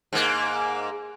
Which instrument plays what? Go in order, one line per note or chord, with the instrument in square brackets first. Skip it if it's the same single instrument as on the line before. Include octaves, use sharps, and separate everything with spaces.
[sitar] G#2 A#3